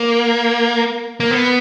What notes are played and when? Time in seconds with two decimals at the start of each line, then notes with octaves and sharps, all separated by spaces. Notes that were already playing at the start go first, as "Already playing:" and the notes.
Already playing: A#3
1.20 A#3
1.31 B3